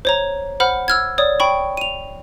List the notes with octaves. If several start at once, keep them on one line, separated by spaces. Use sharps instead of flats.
C5 C#5 A#5
C5 F#5 B5 F6
E6 F6 G#6
C#5 D5 D#6
G5 B5 C#6
D#7 F7